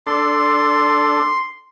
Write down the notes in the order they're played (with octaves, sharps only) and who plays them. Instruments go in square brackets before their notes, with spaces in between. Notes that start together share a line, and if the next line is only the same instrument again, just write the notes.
[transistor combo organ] D4 A4 [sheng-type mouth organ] C6